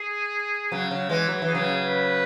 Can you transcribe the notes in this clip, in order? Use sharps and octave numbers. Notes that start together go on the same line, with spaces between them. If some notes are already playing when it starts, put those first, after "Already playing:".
Already playing: G#4
C#3 F#3
C#3 F#3
E3 G#3
F#3
E3
G#4
C#3 F#3
B4